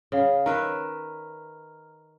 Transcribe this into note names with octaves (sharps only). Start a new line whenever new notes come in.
C#3 G#4 F5
D#3 B4 E5 A#5 F6